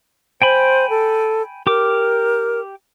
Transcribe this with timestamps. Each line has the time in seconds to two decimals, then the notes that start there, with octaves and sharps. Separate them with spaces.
0.42 C5 G5 G#5 B5
0.90 A4
1.67 G4 A#4 D6